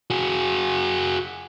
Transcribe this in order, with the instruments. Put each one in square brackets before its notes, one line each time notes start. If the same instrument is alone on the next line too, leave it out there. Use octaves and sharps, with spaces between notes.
[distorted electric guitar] F#4 G#4